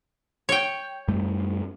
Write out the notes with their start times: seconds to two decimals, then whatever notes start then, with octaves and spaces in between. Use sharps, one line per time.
0.49 C#5 G5
1.08 F#2 G3 A3